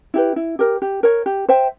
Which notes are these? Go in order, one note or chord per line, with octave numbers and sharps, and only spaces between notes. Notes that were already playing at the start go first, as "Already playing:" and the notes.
E4 G4 B4
E4
G4 A#4
G4
A#4 C#5
G4
C5 E5 G5